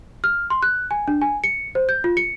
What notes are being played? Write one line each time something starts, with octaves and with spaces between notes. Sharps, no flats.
F6
C6
F#6
G#5
D4
G#5
C#7
C5
G6
F4
C#7